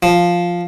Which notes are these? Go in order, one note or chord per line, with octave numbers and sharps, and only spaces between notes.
F3